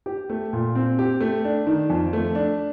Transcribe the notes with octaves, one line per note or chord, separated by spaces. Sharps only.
G4
A3
A#2
C4
G4
A3
D4
D#3
F2
A3
D4